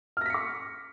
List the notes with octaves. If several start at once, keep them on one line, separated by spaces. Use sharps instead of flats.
D6 F6 A#6 B6 C#7